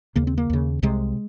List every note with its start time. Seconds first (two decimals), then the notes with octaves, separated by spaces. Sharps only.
0.16 D#2 C#3 A#3
0.27 C4
0.38 A#3
0.50 D#2 C#3
0.83 C2 C3 G#3